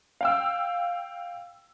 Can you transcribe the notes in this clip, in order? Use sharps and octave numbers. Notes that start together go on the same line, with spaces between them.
F5 G5 E6